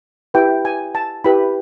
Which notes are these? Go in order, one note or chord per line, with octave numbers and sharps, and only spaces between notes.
E4 G4 B4 G5
G#5
A5
E4 G4 B4 B5